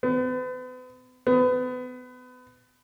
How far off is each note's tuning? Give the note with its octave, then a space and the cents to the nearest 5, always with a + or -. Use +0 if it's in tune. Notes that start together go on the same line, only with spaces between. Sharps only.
B3 +40
B3 +30